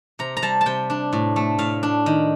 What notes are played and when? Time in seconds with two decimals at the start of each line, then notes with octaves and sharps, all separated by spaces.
0.19 C3 A#5
0.37 A#5
0.42 G3 A5
0.61 A5
0.66 C3 G5
0.90 D4
1.13 A2
1.36 A3
1.58 A2 F5
1.83 D4
2.06 D#3